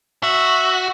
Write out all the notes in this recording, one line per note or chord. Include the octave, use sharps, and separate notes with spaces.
F#4 E5